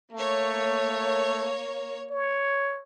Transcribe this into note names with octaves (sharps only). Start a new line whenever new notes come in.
A3 A#3 C#5
C#5